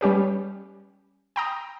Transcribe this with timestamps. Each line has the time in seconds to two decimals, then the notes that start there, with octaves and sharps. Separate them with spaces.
0.01 G3 C#4 G4 B4
1.36 G5 A#5 D#6